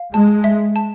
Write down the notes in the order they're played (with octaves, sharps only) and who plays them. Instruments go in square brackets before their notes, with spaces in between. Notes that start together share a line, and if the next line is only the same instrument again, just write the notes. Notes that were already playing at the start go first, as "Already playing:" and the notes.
Already playing: [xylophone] F5
[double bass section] G#3 [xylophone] A5
[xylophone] E5
A5